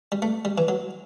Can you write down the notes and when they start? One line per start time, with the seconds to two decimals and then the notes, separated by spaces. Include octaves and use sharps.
0.12 G3
0.22 A3
0.45 G3
0.58 E3
0.68 F#3